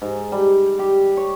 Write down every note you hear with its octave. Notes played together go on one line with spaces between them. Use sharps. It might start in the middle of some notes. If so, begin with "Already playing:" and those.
G#2
G3
G4
C#5